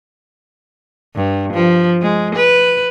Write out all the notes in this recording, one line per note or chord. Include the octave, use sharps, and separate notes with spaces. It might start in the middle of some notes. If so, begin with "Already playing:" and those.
G2
F3
G#3
B4